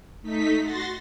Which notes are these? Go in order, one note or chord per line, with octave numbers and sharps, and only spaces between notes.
A3 D#4 B6
F#4 C6 A6 A#6